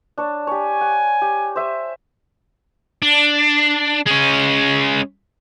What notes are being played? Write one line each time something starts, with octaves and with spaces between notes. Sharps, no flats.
D4 C#5 A5
G4 C#5 G#5
F#5
G4
C5 E5 G#5
D4
G#3 C#4